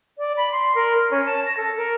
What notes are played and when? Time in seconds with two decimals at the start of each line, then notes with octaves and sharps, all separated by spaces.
0.18 D5
0.36 B5
0.52 C6
0.75 A#4
0.96 F6
1.11 C#4
1.25 A5
1.45 A#6
1.56 A4
1.77 A#4